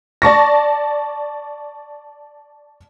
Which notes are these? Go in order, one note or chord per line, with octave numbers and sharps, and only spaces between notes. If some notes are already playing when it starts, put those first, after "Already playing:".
D5 A5 C#6 A#6